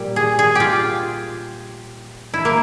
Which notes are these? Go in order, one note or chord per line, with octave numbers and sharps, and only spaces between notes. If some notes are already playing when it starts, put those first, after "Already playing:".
Already playing: A#2 G3
G#4
G#4
F4 G4
E4
A#3